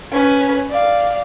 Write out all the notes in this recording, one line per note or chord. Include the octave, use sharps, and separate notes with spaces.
C#4 B4
D5 F5